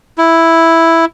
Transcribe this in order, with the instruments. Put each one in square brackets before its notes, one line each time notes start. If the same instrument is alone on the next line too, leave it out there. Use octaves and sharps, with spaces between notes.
[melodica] E4